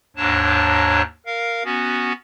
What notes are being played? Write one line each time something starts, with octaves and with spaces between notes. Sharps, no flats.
D#2 G#2 D4 C#5 A5
A#4 F5
B3 C#4 F#4